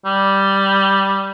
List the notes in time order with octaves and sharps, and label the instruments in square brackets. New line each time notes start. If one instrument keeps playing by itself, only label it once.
[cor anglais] G3